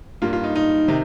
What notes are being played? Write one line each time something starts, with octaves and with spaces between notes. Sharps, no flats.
G2 G3 A#3 F4
F4
D#4
D#4
C3 D#3 D#4